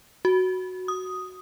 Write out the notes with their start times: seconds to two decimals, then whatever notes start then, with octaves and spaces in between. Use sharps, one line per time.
0.25 F#4
0.88 D#6